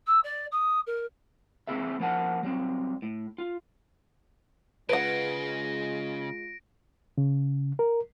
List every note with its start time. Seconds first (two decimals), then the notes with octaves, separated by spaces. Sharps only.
0.06 E6
0.23 D5
0.52 D#6
0.86 A#4
1.67 A#3 C4 E4 G#4 A4 E5
2.00 F3 A#3 F#5 A5
2.43 F#3 G3 C4
3.02 A2
3.38 F4
4.89 C#3 G#3 F4 B4 F#5 A#6 D7
7.18 C#3
7.79 A#4